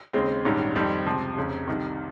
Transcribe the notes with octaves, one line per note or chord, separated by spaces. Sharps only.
D#2 C#3 G#3 C4
A#1 G#2 D#3 G3 C#4
F2 D#3 G3 C4
C#2 C3 F3
F1 F2 C#3
C2 C3 D#3